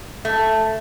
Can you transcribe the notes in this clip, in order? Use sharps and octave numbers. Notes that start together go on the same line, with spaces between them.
A3